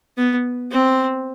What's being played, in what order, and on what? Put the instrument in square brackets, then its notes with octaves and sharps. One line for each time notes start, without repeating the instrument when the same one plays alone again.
[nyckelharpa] B3
C4